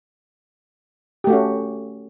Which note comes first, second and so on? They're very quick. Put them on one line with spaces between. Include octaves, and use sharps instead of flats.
G4 A3 F#4 C#4